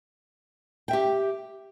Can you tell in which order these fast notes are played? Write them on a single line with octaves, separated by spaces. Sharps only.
G5 E5 G4